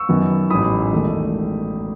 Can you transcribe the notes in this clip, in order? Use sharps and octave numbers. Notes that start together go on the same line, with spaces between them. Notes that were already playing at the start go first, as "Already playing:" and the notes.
Already playing: C#6 E6
F#2 D#3 F#3 B3
A1 G#2 E3 B5 D#6
E1 E2 D#3 A3